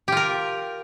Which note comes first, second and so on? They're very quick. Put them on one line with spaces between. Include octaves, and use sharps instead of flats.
G4 F4 A#4